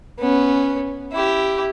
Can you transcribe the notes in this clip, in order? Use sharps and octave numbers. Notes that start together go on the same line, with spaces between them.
B3 C#4
E4 G4